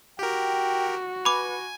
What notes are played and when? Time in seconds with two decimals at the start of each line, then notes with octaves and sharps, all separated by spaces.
0.19 F#4 G4 A#4 G5
1.25 B4 G#5 B5 D6